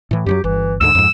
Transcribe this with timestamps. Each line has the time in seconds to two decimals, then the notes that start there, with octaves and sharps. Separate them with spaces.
0.11 A2 E3
0.26 F#2 D#3 F#3 G4
0.44 G1 E3
0.81 D2 G#2 D3 E6
0.95 F2 G#2